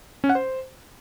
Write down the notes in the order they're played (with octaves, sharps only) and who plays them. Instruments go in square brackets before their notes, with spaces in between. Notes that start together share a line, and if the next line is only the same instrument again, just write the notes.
[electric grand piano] C#4
F#5
C5